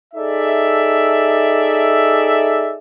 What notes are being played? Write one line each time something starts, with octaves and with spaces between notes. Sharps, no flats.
D#4 G#4 A4 D5 E5